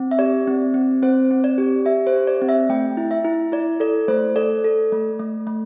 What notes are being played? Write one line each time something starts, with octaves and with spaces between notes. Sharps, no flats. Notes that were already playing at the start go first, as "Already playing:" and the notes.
Already playing: C4
E5
G4 D5
C4
C4
C4 C5
C4
D5
G4
G4 E5
C5
G4
D5
C4
E5
A3 G5
E4
E5
E4
E4 D5
A4 D5
A3 C5
A4 D5
A4
A3
A3
A3